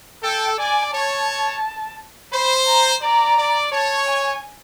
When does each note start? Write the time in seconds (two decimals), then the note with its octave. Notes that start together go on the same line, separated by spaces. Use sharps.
0.24 A4 G5
0.59 D5 G#5
0.94 C#5 A5
2.33 C5 B5
2.67 A#5
3.02 D5 A#5
3.37 D5
3.72 C#5 A5
4.07 G#5